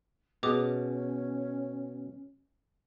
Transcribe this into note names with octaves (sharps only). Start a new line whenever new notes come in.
B2 C#4 G#4 D6 D#6